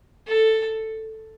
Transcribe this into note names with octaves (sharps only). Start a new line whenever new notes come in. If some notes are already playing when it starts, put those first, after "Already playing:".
A4